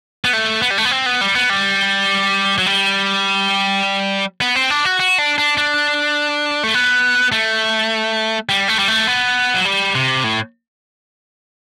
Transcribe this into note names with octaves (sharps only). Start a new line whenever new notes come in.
B3
A3
B3
G3
A3
B3
C4
B3
G3
B3
G3
F#3
G3
B3
C4
D4
F#4
F#4
D4
D4
D4
A3
B3
A3
G3
A3
G3
A3
B3
F#3
G3
C3
A2